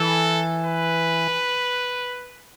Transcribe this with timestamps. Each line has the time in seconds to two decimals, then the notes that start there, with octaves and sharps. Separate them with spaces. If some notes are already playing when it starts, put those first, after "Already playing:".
Already playing: E3 A4
0.65 B4